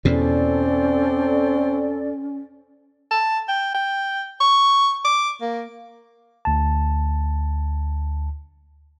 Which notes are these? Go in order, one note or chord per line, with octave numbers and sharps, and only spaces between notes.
E2 B2 C4 C#4 A4 D5
A5
G5
G5
C#6
D6
A#3
D2 A5